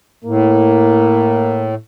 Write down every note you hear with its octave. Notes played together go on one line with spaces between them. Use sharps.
A2 A#3